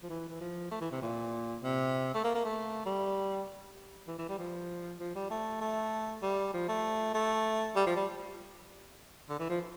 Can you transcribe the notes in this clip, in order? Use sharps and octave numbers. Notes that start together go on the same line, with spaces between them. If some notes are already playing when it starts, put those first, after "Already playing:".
F3
E3
E3
F3
A3
E3
C3
A#2
C3
A3
A#3
A#3
A3
G3
E3
E3
G3
F3
F3
G3
A3
A3
G3
F3
A3
A3
G3
F3
G3
D3
E3
F3